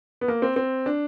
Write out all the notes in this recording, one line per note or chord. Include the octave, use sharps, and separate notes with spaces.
B3
A#3
C4
C4
D4